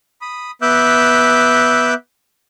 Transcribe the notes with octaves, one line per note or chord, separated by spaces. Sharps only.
B5 D#6
B3 E5 D6 E6 F#6 G6